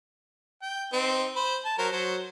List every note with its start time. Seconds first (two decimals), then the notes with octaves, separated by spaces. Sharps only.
0.62 G5
0.93 C4 D#4
1.36 C5 B5
1.65 A5
1.78 F#3 A#4 C5
1.92 F#3 C5